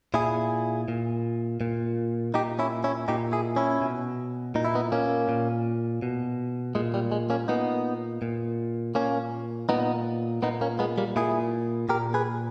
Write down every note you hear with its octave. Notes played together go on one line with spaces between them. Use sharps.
A#2 E4 G#4
A#2
A#2
A#2 D#4 G4
C#4 E4
C#4 E4
A#2 D#4 G4
E4 G#4
C#4 E4
B2
A#2 D#4
E4
B3 D#4
A#3 C#4
A#2
B2
A#2 G#3
G3
G#3
A#3 C#4
A#2 B3 D#4
A#2
A#2 A#3 C#4
A#2 B3 D#4
A#2 B3 D#4
A#3 C#4
G#3 B3
G3 A#3
A#2 E4 G#4
A#2 G4 A#4
G#4 B4